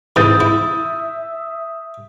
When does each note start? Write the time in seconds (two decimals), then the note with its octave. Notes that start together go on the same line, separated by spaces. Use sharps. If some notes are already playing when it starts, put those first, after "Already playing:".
0.16 G#2 C3 E3 E5 D#6 G6 A6
0.40 E4